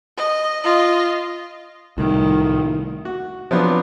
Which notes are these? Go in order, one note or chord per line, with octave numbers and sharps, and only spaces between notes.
D#5
F4 D#5
C2 A2 D#3
F#4
F3 F#3 B3 C4 D4